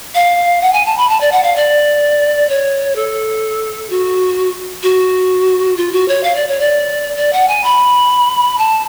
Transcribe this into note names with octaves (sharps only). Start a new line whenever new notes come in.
F5
F#5
G#5
A5
B5
A5
D5
F#5
F5
D5
C#5
A4
F#4
F#4
F4
F#4
C#5
F5
D5
C#5
D5
D5
F#5
G#5
B5
A5